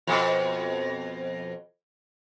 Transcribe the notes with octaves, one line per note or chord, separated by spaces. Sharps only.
F2 B2